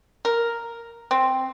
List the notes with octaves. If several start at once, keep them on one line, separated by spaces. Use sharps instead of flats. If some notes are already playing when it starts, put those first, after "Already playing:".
A#4
C4